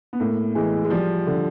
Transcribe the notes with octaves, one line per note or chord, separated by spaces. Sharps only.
B3
A2 A#3
E3 G#3
G#3
F3 G3
D3